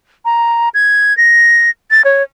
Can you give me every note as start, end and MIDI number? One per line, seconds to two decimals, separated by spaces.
0.25 0.69 82
0.74 1.16 92
1.17 1.70 94
1.91 2.02 93
2.05 2.23 73